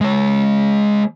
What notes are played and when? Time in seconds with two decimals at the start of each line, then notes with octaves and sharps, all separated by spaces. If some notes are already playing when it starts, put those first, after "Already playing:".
0.01 G#3 C#5